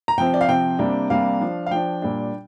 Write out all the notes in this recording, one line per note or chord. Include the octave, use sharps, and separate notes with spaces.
A#5
C3 F3 C4 G5
D5
F5
C3 F3 C4 G5
C3 G3 A#3 D4
C3 G3 A#3 D4 F5
F3 D4
F5
F3 D4 G5
A#2 G3 D4